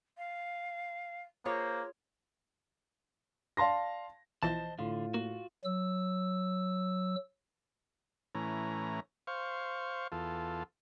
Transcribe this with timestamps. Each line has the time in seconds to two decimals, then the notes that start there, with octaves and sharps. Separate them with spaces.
0.17 F5
1.45 A#3 F4 G#4 C5 C#5
3.57 D5 F5 A5 C6 A#6
4.43 B1 E3 F3 C5 D#5 A5 A6
4.79 A2 D3 F4 C6
5.14 A#3 F#4
5.65 F#3 E6
8.35 A2 E3 C#4 A#5
9.27 C5 F5 C#6
10.12 E2 F4 A4